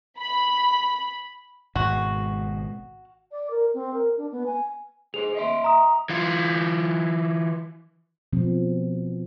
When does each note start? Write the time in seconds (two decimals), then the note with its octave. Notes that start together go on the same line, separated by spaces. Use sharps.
0.19 B5
1.75 G#1 G#2 B2 F#4
3.31 D5
3.50 A#4
3.74 C4
3.94 A#4
4.17 D4
4.32 B3
4.46 G#5
5.14 G#4 C5 F7
5.35 D#5 E5 C6
5.64 A#5 D#6
6.09 E3 F4
8.33 B2 F3 C4